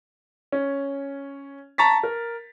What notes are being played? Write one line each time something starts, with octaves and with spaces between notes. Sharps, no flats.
C#4
A5 A#5 C#6 A6 B6
A#4